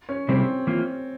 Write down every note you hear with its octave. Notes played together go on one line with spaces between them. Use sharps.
C#4
C3 G3 A#3 C4 E4 G#4
E3 A#3 F4